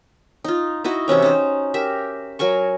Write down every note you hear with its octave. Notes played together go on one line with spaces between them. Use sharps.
D#4 F4
D#4 E4 F#4 D#5
C3 E3 C#4 C#5
C#4 D#4 C5
G4 A#4 E5
F#3 A#4 G#5 C#6